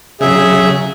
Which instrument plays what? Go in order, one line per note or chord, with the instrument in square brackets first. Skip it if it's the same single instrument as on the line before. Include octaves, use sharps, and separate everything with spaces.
[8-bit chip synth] C#3 F#3 [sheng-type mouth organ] G#4 E5